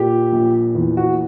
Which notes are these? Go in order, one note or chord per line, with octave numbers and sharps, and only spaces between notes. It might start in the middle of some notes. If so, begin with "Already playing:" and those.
Already playing: A#2 G4
A#1
E2
F#4